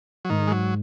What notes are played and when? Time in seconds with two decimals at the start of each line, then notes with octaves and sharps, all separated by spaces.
0.25 F#3
0.29 G#2 D#3
0.47 G#3
0.51 F#3